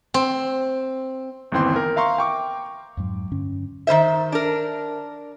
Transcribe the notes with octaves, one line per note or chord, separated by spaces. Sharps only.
C4
G1 D#2 E3 C4 G5 C6
A#4
E5 F5 A#5 C6 C#6
G5 C#6 D6
F2 G#2 F#3
G2 D3 C#4
D#3 G#3 C5 E5
D4 A#4